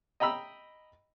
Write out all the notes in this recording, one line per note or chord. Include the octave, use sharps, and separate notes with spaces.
D#5 G5 A#5 B5 E6